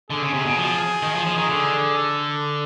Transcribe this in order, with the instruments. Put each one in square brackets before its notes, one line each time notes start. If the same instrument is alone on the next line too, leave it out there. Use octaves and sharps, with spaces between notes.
[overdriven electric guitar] D3 [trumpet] G#4
[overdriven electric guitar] C#3
C3
B2
F3
D#3
F3
F3
D#3
D3
[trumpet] A4